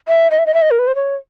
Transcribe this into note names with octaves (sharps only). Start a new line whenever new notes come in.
E5
D#5
E5
D#5
E5
D#5
A#4
B4
C5
C#5